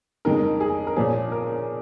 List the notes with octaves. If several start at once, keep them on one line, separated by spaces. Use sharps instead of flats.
F2 C#3 G#3 D#4 A#4
G#4
A#4
A#2 F3 C#4 G#4
A#4